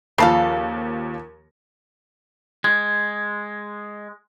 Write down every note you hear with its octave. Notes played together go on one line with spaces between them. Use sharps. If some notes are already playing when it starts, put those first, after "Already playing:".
D#2 C#3 F3 A4 F5
G#3 G#6